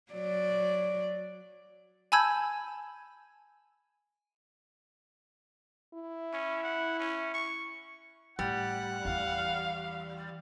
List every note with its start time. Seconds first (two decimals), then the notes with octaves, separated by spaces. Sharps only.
0.12 F#3 D5
2.12 G#5 A5 B5 E6 G6 G#6
5.94 E4
6.34 C#4
6.64 F#5
7.00 C#4
7.34 C#6
8.39 A2 G3 F#5
9.05 E2 E3 F5